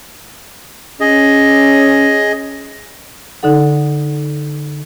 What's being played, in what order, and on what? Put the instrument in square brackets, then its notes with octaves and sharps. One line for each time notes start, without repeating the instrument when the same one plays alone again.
[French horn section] C#4 [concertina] G#4 D#5
[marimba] D3 D#4 A4 F#5